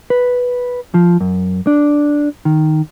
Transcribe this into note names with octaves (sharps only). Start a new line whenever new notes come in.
B4
F3
F#2
D4
D#3